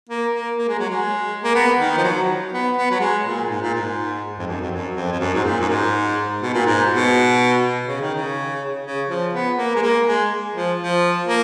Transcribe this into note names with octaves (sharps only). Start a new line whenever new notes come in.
A#3
A#3
A#3
G#3
F#3
G#3
A#3
B3
D#3
F3
F#3
B3
B3
F#3
G#3
A#2
G#2
A#2
G#2
F2
F#2
F2
F#2
F2
F2
F#2
G#2
A#2
F#2
G#2
B2
A#2
G#2
B2
C#3
D#3
C#3
C#3
F3
B3
A#3
G#3
A#3
G#3
F3
F3
A#3